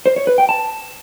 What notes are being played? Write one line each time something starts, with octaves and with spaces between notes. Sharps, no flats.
C5
C#5
B4
G5
A5